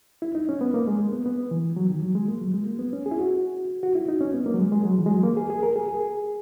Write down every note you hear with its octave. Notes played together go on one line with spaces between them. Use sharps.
E4
D#4
C#4
B3
A#3
G#3
G#3
B3
B3
E3
F#3
D#3
F#3
G#3
A#3
F#3
G#3
A#3
B3
C#4
G#4
E4
F#4
F#4
E4
D#4
C#4
B3
A#3
F#3
G#3
G#3
F#3
E3
G#3
F#3
A#3
G#4
G#4
A#4
G#4
G#4